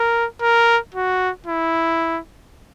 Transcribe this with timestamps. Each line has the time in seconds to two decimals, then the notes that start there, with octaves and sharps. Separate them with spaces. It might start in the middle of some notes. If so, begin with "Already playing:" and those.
Already playing: A#4
0.42 A#4
0.95 F#4
1.47 E4